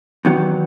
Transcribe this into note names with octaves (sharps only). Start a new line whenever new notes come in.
E2 D#3 F#3